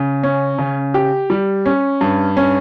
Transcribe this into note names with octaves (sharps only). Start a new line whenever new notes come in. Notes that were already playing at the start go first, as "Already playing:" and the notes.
Already playing: C#3
C#4
C#3
G4
G3
C#4
G2
C#4